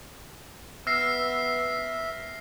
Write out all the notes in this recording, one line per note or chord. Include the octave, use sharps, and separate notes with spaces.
B3 E5 E6 F6 A#6 C7